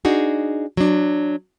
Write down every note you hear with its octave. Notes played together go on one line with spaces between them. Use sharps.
D4 D#4 F#4 G#4
F#3 D4